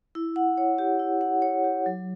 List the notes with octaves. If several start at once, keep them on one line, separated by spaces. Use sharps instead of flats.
E4
F#5
C#5
G4
E4
F#5
C#5
G4
F#3